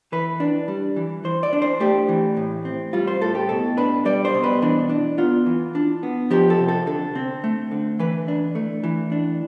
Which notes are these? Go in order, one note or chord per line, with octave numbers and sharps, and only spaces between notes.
E3 B4
D4
G3
E3
E3 C5
D5
D4
C5
A3 G4
E3
A2
C4
G3 F4
C5
A2 A4
G4
B2 A4
D4 B4
G3 D5
C5
B2
B4
E3 D4
D4
B3 F4
E3
D4
B3
F3 G4
A4
C3
A4
D3 A4
C4
A3
D3
E3 B4
D4
A3
E3
D4